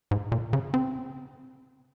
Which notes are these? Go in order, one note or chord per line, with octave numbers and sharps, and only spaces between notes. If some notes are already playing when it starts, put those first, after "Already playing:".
G#2
A#2
C#3
C4